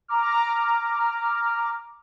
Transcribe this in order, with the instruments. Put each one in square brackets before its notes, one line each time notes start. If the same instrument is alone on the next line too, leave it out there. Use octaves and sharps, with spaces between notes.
[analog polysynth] A#5 D6 F6